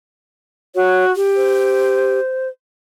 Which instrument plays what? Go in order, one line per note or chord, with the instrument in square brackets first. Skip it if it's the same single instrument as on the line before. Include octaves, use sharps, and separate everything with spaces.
[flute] F#4 [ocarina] C#5
[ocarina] G4
[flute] C5